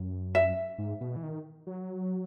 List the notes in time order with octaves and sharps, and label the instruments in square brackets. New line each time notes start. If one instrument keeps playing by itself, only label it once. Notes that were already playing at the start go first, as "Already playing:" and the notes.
Already playing: [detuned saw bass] F#2
[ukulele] E5
[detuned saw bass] G#2
B2
E3
D#3
F#3